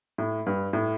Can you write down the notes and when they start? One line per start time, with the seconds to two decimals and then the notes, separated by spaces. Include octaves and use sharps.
0.18 A2
0.46 G2
0.73 A2